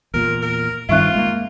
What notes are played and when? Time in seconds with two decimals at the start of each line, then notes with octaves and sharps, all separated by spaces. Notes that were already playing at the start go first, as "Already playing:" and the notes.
0.14 E2 A#2 A#4
0.42 A#4
0.89 G2 D#3 C4 F4 E5 C#6 F#6
1.15 G#3 A#3